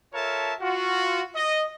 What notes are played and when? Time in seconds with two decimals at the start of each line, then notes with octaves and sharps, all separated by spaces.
0.14 F4 A4 A#4 C#5 E5 A5
0.60 F4 F#4
1.35 D#5